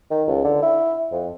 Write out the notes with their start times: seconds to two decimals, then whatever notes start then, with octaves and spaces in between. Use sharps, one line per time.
0.11 D#3
0.28 C#2
0.44 D3
0.62 E4
1.12 F2